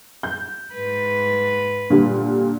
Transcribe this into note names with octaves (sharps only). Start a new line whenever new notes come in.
G6
G#2 B4
A#2 D3 G3